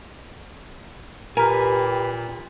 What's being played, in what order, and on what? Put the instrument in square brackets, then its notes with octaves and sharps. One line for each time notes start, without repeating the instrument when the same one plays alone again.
[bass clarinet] A#2 [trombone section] G4 [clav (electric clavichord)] A#4 [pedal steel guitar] B4 G#5